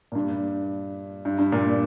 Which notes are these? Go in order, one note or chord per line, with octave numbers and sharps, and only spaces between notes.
A#2
G2
G2
G2
A#2